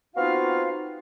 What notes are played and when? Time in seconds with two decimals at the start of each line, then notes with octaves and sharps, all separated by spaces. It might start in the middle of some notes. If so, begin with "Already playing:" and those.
0.15 B3 C4 D#4 F4 F#4 F5